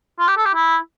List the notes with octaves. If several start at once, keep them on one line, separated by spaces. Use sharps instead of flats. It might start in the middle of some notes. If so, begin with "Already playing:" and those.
F4
G4
A4
G4
E4